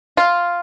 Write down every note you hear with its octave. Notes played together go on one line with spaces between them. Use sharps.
F4